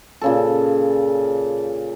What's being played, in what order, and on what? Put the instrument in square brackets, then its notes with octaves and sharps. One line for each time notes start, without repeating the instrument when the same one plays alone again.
[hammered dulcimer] A#2 C#3 A4